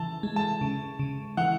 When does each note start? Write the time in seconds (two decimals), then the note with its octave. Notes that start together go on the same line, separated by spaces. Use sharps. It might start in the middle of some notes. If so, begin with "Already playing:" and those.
Already playing: C#3 E3 A5
0.23 G#3
0.36 A5
0.61 C#3
0.99 C#3
1.37 E3 F#5